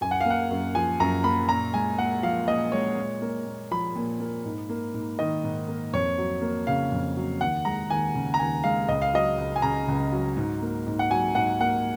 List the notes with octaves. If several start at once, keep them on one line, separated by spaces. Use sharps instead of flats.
F#2 G#5
F#5
A#3 F5
F#5
F#2
F3 G#5
F#2 A#5
A#3 B5
A#2 A#5
G#3 G#5
A#2 F#5
F3 F5
A#2 D#5
G#3 C#5
A#2
A#3
A#2
F3 B5
A#2
A#3
G#2
A#3
G#2
D#3 D#5
G#2
A#3
F2 C#5
F#3
A#3
C#3 F5
F2
F#3
D#2 F#5
G#3 A#5
D#2 G#5
C#3
A#5
D#2 G#5
G#3 F5
C#2 D#5
F5
F#3 D#5
C#2
G#5
C#3 A#5
C#2
F#3
G#2
A#3
G#2
F#5
F#3 G#5
G#2 F#5
A#3 F#5